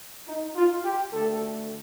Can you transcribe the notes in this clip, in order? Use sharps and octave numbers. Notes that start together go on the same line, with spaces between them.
D#4
F4
G4
D2 D3 A3 A4